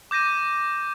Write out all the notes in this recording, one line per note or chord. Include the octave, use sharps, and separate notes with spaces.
D6 G6 A#6 D#7